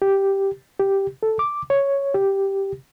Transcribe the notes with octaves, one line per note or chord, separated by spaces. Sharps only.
G4
G4
A4
D6
C#5
G4